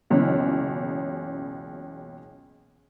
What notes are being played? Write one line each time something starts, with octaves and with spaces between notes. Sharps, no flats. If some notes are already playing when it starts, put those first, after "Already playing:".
F#1 C#2 B2 E3 C#4